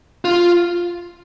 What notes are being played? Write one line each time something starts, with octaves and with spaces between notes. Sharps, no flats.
F4